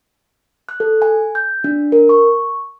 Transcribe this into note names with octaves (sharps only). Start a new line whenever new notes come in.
F#6
A4
G#5
G6
D4
A#4
C#6